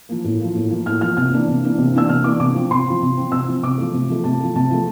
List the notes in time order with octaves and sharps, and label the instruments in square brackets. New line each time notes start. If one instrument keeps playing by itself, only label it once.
[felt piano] F3 A#3
A2
F3 A#3
A2
F3 A#3
A2 F6
F3 A#3 F6
C3 F6
E3 A#3 D4
C3
E3 A#3 D4
C3
E3 A#3 D4 E6
C3 F6
E3 A#3 D4 D6
C3 D6
F3 C4
C3 C6
F3 C4
C3
F3 C4
C3 E6
F3 C4
C3 D6
F3 A3
C3
F3 A3
C3 A5
F3 A3
C3 A5
F3 A3